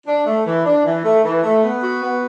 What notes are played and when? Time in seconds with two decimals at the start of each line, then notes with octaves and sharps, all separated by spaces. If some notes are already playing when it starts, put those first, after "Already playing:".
0.06 D4
0.26 A3
0.46 E3
0.65 D4
0.85 E3
1.04 A3
1.24 E3
1.43 A3
1.63 B3
1.83 F#4
2.01 B3